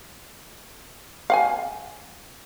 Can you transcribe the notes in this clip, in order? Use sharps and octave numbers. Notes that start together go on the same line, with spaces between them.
F5 F#5 G#5